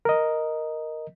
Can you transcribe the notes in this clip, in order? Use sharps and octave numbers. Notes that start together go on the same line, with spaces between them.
A#4 D#5